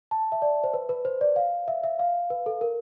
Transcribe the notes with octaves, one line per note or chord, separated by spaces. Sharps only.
A5
E5
D5
C5
B4
B4
C5
D5
F5
E5
E5
F5
B4
A4
A#4